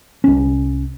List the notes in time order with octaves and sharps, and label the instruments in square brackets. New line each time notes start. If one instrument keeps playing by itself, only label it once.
[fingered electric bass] C2 C#4